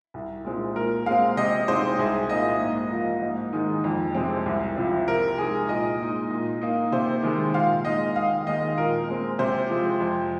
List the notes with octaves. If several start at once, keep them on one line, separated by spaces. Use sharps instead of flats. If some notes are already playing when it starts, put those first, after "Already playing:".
C2
A#2 G#3 C4 D#4
A#2 A#4
G#3 C4 F5
C3 D#5
G#3 C4 D#4 C5
C2 G#4
A#2 A#3 D#4 D#5
G#2
F3 A#3
G#2
D#3 G#3 D#4
F2
C3 G#3 C4
C2
C3 F3
C3 A#4
G#3 D#4 G#4
A#2 D#5
G#3 D#4
A#2
A#3 D#4
C3 C5
D#3 G#3
A#2 F5
G#3 D#4 D#5
D#2 F5
D#3 G#3 D#5
A#2 A#4
G#3 C4
C3 C5
F3 G#3
F2